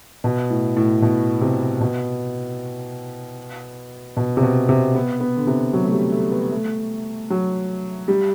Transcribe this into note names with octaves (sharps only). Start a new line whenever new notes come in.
B2
A2
A2
B2
C3
B2
B2
C3
B2
C3
B3
B3
D3
C3
F#3
A3
G3
A3
B3
A3
F#3
G3